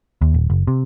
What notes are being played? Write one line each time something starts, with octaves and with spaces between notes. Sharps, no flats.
D#2
D#1
F#1
C3